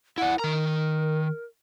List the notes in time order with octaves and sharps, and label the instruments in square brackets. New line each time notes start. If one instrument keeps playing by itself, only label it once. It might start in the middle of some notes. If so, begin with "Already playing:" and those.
[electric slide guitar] E4 D5 [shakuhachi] F#5
[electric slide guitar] D#3 A#5 [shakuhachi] A#4